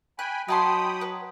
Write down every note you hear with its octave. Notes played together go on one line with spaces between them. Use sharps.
G5 G#5 B5 F#6
F#3 D#4 G5 A5 B5 C6 D#6
B4